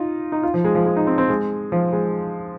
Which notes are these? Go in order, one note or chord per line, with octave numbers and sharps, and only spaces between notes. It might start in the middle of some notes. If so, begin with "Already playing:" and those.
Already playing: D#4 F4
D#4
F4
F3
G#3
F3
G#3
D#4
C4
C4
G#3
F3
G#3